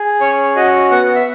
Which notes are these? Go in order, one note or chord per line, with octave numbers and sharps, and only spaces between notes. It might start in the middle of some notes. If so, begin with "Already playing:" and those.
Already playing: G#4
C#4 C#5
F#4 D#5
B3 F#5
E5